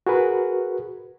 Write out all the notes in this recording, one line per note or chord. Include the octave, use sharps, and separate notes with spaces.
F#4 G#4 A#4 B4